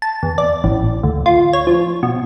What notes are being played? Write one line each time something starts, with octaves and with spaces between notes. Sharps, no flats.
A5
E2
D5
A1
D2
F4
C#5
F3
B2